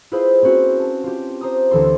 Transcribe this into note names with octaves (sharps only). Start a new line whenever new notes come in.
E4 F4 G#4 B4 C5
A#3 C4 C#4 F#4
A5
F4 G4
C5 A#5 D#6
D2 D3 E3 A4 C6